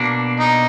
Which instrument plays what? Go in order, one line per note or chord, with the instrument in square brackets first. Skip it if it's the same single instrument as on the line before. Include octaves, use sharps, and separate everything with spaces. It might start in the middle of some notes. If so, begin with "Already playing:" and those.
Already playing: [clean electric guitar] B2 A#3 D4
[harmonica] D#4